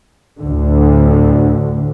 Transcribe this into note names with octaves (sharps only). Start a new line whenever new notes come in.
D2 A2 D3